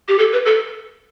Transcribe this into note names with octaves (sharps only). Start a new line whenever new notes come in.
G4
A4
B4
A4